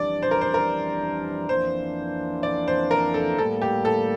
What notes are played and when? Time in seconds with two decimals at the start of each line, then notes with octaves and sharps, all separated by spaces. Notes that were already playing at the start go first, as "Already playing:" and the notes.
Already playing: F2 E3 G3 D4 D5
0.23 C5
0.31 A#4
0.41 C5
0.54 A#4
1.49 F2 E3 A#3 D4 C5
2.43 D5
2.68 C5
2.91 A#4
3.14 A4
3.38 A2 G3 A#3 A4
3.62 G4
3.85 A4